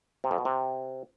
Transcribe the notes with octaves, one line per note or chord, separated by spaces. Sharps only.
C3
F2
B2
C3